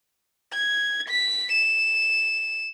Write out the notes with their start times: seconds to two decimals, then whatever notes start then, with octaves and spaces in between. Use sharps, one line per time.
0.53 G#6
1.09 B6
1.52 E7